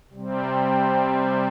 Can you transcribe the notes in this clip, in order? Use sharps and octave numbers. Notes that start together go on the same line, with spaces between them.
C3 G3 C4